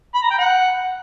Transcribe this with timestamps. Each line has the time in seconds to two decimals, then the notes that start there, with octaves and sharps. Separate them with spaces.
0.14 B5
0.22 A#5
0.30 G5
0.38 F#5